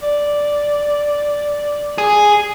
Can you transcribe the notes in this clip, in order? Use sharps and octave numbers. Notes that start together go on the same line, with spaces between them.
D5
G#4